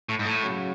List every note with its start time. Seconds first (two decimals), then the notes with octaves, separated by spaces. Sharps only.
0.09 A2
0.19 G#2
0.25 A2
0.42 C#3 F#3